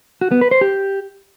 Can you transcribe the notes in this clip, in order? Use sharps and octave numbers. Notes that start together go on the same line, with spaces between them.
F#4
B3
B4
C5
G4